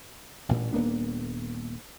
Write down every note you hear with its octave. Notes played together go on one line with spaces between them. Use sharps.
A1 G2 A#2
D#1 A#3 B3 D4